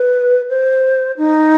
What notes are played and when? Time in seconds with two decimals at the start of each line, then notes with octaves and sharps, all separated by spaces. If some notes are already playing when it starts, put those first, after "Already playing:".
Already playing: B4
0.49 C5
1.17 D#4